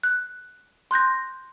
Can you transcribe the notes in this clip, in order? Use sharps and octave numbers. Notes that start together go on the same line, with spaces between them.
F#6
C6 F#6 G6 A#6